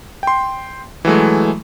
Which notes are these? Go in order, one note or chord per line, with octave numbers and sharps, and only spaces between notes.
G5 C6
E3 F#3 G#3 A3